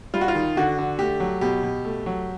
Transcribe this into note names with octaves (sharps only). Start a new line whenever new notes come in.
G3 F4
F#4
F4
D#3
D3 F#4
D3
A3 G4
F#3
B2 G4
B2
A3
F#3